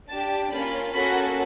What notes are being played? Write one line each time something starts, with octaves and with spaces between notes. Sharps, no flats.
D4 G4 A5
A#3 C#4 F4 B5
A#3 C#4 F#4 A4 B5